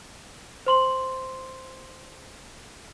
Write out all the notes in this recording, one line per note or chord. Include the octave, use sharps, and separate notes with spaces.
C5 C6 F#7